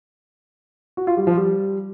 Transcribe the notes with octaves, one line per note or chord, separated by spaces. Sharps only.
F#4
F4
G3
F3
G3